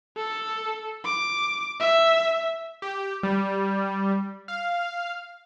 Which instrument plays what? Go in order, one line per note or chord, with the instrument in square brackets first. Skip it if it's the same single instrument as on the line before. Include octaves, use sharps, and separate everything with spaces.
[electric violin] A4
D6
E5
[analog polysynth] G4
G3
F5